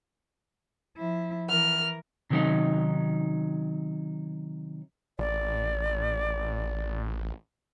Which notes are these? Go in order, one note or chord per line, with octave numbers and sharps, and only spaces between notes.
F3 E4
E3 A#4 F6
C3 D#3 F#3 B3 C#4 D#4
A1 D5